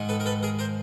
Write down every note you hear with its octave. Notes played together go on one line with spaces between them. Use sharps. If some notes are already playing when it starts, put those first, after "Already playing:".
Already playing: G#2 D#3
A4 B4
A#4
A4 B4
G#4 A#4
A#4 C5